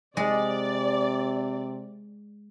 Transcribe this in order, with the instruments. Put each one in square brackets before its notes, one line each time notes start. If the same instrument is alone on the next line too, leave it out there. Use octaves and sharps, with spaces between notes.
[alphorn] C3 [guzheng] G#3 [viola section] D5